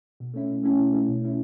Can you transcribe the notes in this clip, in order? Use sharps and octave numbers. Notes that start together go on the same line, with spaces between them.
B2
A3 C#4 E4
B2
A3 C#4 E4
B2
A3 C#4 E4
B2
A3 C#4 E4